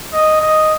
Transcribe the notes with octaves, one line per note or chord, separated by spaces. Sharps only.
D#5
D#5